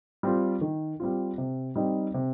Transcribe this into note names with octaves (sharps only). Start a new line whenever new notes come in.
G3 C4 F4
D#3
G3 C4 F4
C3
G3 C4 D#4
C3